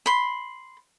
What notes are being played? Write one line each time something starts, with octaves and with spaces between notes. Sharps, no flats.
B5 C6